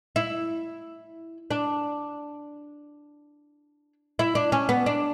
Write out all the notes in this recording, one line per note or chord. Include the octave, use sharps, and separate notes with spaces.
E4
D4
E4
D4
C#4
B3
D4